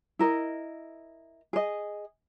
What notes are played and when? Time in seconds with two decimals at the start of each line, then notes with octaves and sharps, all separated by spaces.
0.19 E4 A#4 D#5
1.53 G#4 D#5